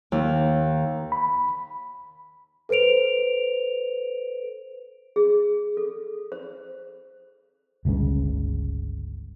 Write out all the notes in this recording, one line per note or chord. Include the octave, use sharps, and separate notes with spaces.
D#2
B5
A4 B4 C5 D7 F7
G#4
A4
C5
G1 C#2 G2 C#3